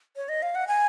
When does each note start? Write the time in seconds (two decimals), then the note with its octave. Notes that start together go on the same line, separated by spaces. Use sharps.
0.16 C#5
0.29 D#5
0.42 F5
0.55 F#5
0.68 G#5